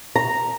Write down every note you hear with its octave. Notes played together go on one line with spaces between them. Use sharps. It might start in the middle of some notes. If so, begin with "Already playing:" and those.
A#5